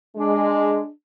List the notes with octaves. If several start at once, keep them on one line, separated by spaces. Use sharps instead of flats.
G#3 D4